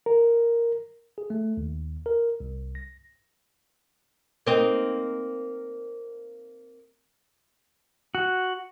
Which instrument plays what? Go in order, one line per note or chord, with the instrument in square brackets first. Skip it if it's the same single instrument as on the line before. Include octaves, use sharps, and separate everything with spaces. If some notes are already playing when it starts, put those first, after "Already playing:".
[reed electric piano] A#4
[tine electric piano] G#4
A3
D#2
A#4
C2
A#6
[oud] A#3 C4 D#4
[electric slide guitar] F#4